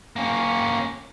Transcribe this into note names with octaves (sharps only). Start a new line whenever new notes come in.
A#3 C#4